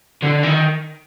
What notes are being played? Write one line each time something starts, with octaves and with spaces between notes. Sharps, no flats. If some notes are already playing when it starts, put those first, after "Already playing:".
D3
D#3